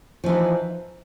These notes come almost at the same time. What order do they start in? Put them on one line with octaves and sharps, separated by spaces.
F3 E3 D#4